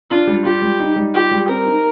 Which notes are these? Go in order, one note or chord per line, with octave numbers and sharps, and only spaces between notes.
D4 F4
G3
F4 G4
G3
D#4
G3
F4 G4
G3
C4 A#4
D#4